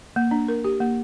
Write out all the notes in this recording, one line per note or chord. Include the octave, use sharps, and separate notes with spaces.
A#3
D4
A#4
G4
A#3